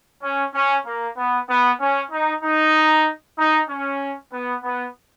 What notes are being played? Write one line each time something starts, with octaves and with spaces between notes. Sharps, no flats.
C#4
C#4
A#3
B3
B3
C#4
D#4
D#4
D#4
C#4
B3
B3